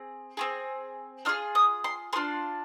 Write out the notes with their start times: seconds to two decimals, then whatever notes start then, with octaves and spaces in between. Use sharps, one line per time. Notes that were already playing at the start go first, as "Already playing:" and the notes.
Already playing: C4 G#4
0.37 C4 F4 G#4
1.25 D4 F4 G#4 F6
1.55 D#6
1.84 C6
2.13 D4 F4 G#4 C6